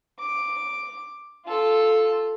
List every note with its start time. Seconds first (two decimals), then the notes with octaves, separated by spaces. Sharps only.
0.19 D6
1.46 F4 A4